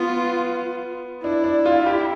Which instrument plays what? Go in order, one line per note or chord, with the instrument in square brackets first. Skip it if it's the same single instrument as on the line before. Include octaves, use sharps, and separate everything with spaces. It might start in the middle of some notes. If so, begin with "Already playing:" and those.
Already playing: [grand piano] B3 [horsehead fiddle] F4
[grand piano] D4 [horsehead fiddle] E4
[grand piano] D4
F4
G4